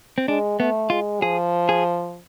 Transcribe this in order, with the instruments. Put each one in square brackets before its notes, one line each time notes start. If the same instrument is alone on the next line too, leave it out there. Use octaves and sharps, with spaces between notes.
[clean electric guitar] C4
[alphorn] G#3 [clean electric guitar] D4
[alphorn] A3 [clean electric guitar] B3
[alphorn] G#3 [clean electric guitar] F4
[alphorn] F3 [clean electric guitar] G#4
[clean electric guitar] G#4